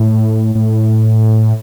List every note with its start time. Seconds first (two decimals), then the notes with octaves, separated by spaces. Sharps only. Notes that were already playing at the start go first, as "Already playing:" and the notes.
Already playing: A2
0.55 A2